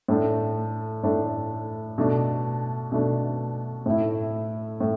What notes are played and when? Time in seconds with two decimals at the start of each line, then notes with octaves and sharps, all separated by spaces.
0.08 A2 A3 D4
1.04 A2 A3 D4
1.98 B2 A3 D4
2.92 B2 A3 D4
3.86 A2 A3 E4
4.80 A2